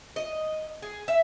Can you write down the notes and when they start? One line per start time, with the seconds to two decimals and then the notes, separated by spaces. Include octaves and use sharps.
0.16 D#5
0.82 G#4
1.08 E5